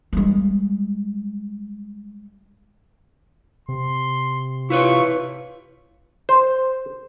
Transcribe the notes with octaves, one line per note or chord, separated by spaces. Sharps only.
G3 G#3
C3 C6
E4 F4 B4 C#5 C#6
C5